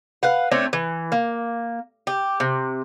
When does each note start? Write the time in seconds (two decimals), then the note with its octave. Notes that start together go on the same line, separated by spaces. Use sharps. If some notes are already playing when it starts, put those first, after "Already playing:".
0.23 B4 F5 F#5
0.52 A3 C4 D4 C#5
0.73 E3
1.12 A#3
2.07 G4
2.40 C3